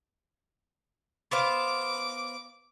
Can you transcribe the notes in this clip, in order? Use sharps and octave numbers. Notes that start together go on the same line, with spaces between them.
B3 C5 F5 D6